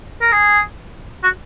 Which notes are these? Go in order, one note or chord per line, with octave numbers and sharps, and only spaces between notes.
A#4
G#4
F#4